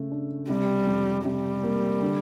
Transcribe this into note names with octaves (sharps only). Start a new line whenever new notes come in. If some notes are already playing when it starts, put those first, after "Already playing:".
Already playing: C#3 A3
D4
C3 G3
F2
C3 G3
A#3
D3